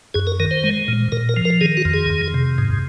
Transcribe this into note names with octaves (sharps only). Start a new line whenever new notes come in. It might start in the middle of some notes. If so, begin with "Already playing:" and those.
F#2 G#4
A#4
D#3 A#4
C5
G#3
A#2
A#2 A#4
A#4
F3
A#4
D#3 G#4
F#4
F2
G#4
F2
C3
G#2